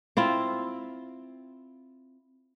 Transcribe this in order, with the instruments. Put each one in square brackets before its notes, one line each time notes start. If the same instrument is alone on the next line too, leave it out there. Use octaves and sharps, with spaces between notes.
[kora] C4 E4 F4